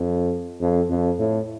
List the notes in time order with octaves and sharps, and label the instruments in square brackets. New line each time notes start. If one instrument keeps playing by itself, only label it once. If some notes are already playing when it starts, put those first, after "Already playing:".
Already playing: [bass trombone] F2
F2
F2
A2